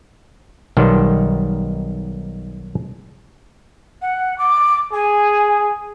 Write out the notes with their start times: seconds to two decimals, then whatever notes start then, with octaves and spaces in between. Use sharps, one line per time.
0.77 B1 D#3 G3 B3 C5
4.02 F#5
4.38 D6
4.93 G#4 G#5